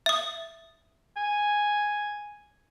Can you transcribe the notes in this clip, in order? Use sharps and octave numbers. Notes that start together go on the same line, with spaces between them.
E5 D#6
G#5